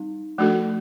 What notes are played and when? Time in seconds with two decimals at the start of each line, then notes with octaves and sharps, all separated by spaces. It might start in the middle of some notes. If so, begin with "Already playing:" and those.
Already playing: G3 C4 D#4
0.38 F3 A3 D4 F#4 A4